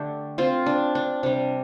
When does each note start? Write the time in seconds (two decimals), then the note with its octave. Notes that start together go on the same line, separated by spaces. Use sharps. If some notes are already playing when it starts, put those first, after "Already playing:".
Already playing: D3 A3 D4 G4
0.38 C4 F4
0.66 D4
0.95 D4
1.23 C3 G3 D4